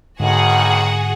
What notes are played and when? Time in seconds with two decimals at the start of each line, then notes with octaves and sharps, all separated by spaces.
0.20 B1 G#2 D3 D#3 F#4 G#4 F#5